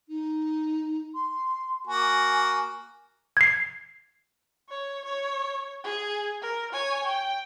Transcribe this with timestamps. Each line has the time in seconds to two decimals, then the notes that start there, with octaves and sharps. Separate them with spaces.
0.09 D#4
1.15 C6
1.87 A#3 F#4 G#5
3.37 G#6 C7
4.70 C#5
5.05 C#5
5.84 G#4
6.42 A#4
6.73 C#5 G#5
7.04 G5